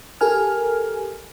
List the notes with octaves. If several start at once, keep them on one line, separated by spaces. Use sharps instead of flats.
G4 A4 A#4 G#5 F6